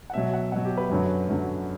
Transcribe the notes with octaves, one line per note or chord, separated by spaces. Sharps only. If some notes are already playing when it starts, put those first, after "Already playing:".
F#5
B2 F#3 E5
F#5
B2 F#3 F#5
G4
B4
F#2 D3 F#3
F#2 D3 F#3